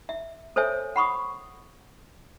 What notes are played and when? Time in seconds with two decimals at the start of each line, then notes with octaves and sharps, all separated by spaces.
0.09 E5
0.56 A4 C5 C#5 E5 G#5
0.96 F#5 B5 C#6 D#6